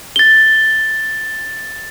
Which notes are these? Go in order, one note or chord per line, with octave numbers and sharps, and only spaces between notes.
A6 G7